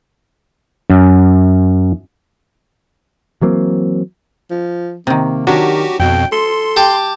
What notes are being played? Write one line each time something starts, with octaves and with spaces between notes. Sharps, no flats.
F#2
E3 F#3 A#3 C4
F3
C3 D#3 A#3
D#3 F#3 D4 F#4 G4
F2 B2 G5
A4 C6
G4 A5 D6